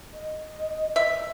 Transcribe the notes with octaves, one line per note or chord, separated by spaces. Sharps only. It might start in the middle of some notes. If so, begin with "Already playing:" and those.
D#5
E5